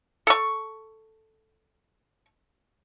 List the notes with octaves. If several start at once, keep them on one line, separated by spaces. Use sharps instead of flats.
A4 C#6